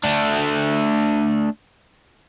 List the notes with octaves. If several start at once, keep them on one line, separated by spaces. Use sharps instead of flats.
A3 D4